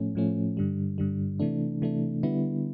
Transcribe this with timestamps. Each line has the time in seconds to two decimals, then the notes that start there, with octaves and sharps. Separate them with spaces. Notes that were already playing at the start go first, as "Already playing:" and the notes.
Already playing: A2 F3 A3 C#4
0.15 A2 F3 A3 C#4
0.57 G2 D3 G3
0.98 G2 D3 G3
1.40 C3 E3 A3 D4
1.82 C3 E3 A3 D4
2.23 D3 G3 B3 E4